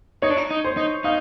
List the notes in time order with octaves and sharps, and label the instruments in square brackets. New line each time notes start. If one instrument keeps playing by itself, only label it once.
[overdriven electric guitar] D#4 [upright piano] C#5
[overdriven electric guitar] D4
D#4
D#4
[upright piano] C5
[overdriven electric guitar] D#4
[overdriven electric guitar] D#4 [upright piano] F5